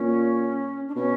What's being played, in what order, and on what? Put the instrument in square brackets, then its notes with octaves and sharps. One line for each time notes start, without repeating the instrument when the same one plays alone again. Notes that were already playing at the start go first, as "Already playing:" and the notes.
Already playing: [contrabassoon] A#2 [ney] C#4
[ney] D4
[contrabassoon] B2 [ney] C#4